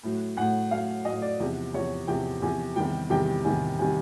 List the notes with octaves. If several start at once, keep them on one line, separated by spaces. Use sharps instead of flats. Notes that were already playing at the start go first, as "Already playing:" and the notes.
A2 F#3
A2 F#3 F#5
A2 F#3 F5
A2 F#3 D#5
D5
E2 C3 F3
E2 C3 F3 C#5
E2 C3 F3 G5
E2 C3 F3 G#5
E2 C3 D#3 G3 G5
E2 C3 D#3 G3 G5
E2 C3 D#3 G3 G#5
C3 D#3 G3 G#5